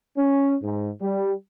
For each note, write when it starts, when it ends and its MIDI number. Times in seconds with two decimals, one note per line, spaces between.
0.17 0.55 61
0.62 0.89 44
1.01 1.32 55